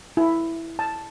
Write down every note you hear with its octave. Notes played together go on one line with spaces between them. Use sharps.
E4
A5